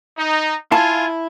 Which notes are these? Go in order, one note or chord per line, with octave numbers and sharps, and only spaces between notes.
D#4
E4 F4 G#5 A5